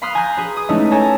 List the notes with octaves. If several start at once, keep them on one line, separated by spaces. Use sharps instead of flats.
F5 B5 C6 D#6 F6 F#6
G#5 A#5 C6 F#6 G6
G#4 B4
D#6
G#3 A3 C#4 D#4 E4
A4 C#5 G#5 A#5